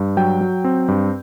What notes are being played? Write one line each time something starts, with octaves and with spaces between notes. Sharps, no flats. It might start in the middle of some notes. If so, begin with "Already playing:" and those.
Already playing: G2
F#3 G5
F#3
C4
G2